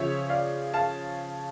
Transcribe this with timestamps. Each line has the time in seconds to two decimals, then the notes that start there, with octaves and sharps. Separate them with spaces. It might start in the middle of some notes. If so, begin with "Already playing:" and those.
Already playing: C#3 F3 C#5 E5
0.30 D5 F5
0.74 F5 A5